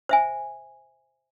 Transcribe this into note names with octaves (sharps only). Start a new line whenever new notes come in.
C5 E5 G#5